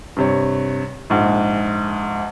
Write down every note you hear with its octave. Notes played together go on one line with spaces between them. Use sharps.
G2 C3 C#5
A#1 G#2